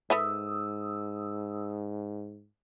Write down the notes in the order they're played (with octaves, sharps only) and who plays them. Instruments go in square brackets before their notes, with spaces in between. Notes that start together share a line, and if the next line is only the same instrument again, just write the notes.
[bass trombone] G#2 [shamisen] A4 B4 E5 [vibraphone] D#6 E6